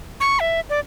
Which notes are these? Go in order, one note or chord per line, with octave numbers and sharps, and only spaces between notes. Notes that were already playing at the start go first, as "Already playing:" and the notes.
C#6
E5
D5